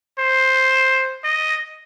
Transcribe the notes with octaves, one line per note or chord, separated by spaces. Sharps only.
C5
D#5